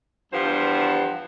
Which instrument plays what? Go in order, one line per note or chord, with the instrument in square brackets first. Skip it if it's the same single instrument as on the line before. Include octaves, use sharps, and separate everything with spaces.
[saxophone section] E2 G2 F3 C5 F#5